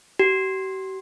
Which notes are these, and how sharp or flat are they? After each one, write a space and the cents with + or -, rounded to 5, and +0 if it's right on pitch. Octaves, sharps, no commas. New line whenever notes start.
G4 -45